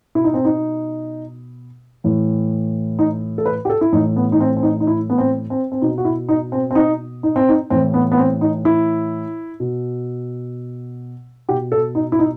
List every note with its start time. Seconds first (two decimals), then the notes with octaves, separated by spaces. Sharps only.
0.15 B2 E4
0.24 D#4
0.34 C4
0.45 D#4
2.04 A2 E3
2.99 D#4
3.38 A4
3.45 B4
3.65 G4
3.70 A4
3.81 E4
3.92 A2 E3 D#4
4.16 B3
4.32 D#4
4.40 C4
4.57 C4
4.63 D#4
4.80 D#4
4.87 E4
5.10 B3
5.18 C4
5.50 C4
5.72 C4
5.82 B2 D#4
5.98 F#4
6.05 E4
6.29 D#4
6.52 C4
6.71 C4
6.75 D#4
7.23 D#4
7.36 C4
7.49 D#4
7.70 A2 E3 C4
7.94 B3
8.12 B3
8.18 C4
8.41 D#4
8.65 E4
9.60 B2
11.49 B2 G4
11.72 A4
11.95 D#4
12.12 E4
12.19 D#4